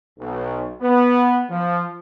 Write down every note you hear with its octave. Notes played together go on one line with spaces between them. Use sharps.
B1
B3
F3